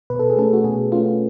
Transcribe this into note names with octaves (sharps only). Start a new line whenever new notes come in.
B2 B4
A4
G#4
A3 C#4 A4
F#4
B2 G#4
A3 C#4 F4